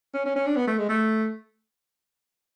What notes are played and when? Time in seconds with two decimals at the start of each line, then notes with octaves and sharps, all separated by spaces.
0.14 C#4
0.26 C#4
0.36 C#4
0.46 D4
0.56 B3
0.67 A3
0.78 G#3
0.89 A3